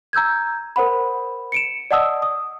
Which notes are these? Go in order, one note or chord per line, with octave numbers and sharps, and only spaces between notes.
A#5 E6 G6 G#6
A#4 C5 F#5 B5
C#7 D7 E7
D5 D#5 F#5 A5 D#6 E6
D#6